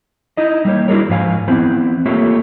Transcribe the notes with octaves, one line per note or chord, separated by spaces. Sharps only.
D#4 E4 D#5
G3 A#3 C#5
D4 E4 F#4 G#4 A#4 C#5
G#2 F3 B4 F5 G#5
E3 B3 C4 E4
A3 A#3 F4 G4 C#5 E5